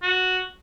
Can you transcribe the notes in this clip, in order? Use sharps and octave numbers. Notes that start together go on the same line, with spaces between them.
F#4